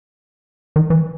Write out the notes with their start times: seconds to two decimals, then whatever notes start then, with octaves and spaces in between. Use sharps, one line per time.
0.76 D#3
0.90 E3